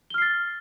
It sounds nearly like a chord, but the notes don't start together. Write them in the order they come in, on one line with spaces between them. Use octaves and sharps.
G7 F6 C7 A6